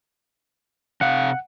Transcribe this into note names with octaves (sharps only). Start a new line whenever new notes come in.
C3 F5 F#5